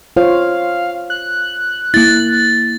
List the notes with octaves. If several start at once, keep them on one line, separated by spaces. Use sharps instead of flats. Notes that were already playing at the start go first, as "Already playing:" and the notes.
F4 C5 C#5 F5
F#6
A#3 E4 A6